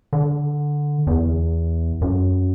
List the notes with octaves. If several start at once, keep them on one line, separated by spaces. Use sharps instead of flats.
D3
E2
F#2